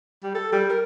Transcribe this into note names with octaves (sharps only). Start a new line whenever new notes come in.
G3
A4
G3
A#4